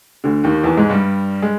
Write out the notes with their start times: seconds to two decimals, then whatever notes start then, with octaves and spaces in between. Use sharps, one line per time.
0.24 D2 D3
0.44 D#2 D#3
0.64 E2 E3
0.77 G#2 G#3
0.90 G2 G3
1.42 G#3